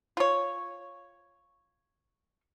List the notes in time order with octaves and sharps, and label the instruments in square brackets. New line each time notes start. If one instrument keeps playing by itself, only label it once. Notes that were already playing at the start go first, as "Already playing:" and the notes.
[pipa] F4 C#5